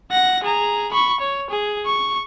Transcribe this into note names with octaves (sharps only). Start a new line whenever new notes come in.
F#5 A#6
G#4 A#5
B5 C#6
C#5
G#4
C#6